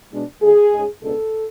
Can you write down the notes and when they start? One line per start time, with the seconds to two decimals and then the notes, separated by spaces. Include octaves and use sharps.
0.11 B2 G#3 D4
0.42 D2 D3 A3 G#4
0.72 G#2 G#3 C#4
1.02 C#2 B2 G#3 B3 D4 A4